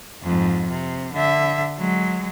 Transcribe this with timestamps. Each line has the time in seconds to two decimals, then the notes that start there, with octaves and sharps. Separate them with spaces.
0.23 F2 G#2
0.70 C3
1.13 D3 E5
1.79 F#3 G#3